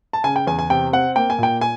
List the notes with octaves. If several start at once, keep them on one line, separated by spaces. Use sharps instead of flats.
A5
C#3 G#5
G5
E2 G#5
G#5
C3 G5
C4 F#5
A#3 G5
G#5
A#2 G5
G#5